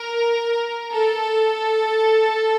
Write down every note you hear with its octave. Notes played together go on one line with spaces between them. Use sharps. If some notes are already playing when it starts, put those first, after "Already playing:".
Already playing: A#4
A4